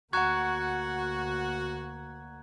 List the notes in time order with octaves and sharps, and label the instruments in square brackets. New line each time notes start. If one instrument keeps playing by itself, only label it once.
[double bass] D2 A#3 [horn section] F#4 [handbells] F#5 C#6 [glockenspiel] A#5 F#6 G#6